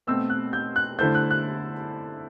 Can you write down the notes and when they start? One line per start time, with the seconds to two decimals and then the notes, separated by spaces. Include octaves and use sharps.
0.07 B2 A3 C4 E6
0.30 F#6
0.53 G6
0.76 F#6
0.99 D3 A3 E4 A4 C5 G6
1.15 F#6
1.31 F#6